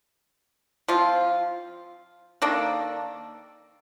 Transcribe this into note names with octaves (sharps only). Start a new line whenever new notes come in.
F3 C4 F4
D#3 A#3 D4 A4